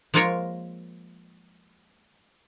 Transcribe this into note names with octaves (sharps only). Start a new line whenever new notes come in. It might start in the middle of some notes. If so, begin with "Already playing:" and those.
F3 G#3 A#3 F4 A#4 C#5